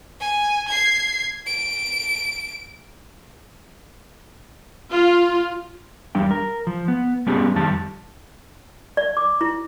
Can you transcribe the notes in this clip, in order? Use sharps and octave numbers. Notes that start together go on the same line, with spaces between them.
G#5
G#6 C7
D7
F4
E2 G3 D4 G5
A#4
F3
B3
G3 B3 C#4 D4 G4 G#4
F2 D#3 G3 A5
D5
D6
E4